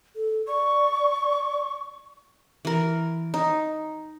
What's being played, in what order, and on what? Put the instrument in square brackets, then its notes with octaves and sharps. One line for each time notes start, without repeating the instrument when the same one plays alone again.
[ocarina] A4
[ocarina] D5 [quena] C#6
[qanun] E3 A#4
D#4